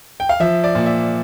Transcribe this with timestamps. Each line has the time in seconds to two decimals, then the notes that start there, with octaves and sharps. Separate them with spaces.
0.20 G5
0.29 F5
0.40 F3 E5
0.64 D5
0.75 A#2
0.86 E5